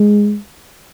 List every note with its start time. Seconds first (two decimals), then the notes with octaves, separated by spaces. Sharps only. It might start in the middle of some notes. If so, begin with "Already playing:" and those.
Already playing: G#3